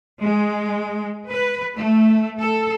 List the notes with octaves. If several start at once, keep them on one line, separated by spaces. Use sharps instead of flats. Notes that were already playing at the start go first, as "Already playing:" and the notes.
G#3
B4
A3
A4